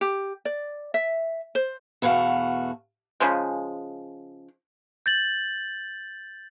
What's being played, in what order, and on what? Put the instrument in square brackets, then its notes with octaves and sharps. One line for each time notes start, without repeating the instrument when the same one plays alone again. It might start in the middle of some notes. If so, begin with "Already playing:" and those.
[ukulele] G4
D5
E5
C5
[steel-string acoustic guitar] E2 B2 A3 F#4 F5
[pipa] C#3 F3 G#3
[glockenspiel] G6 A6 F#7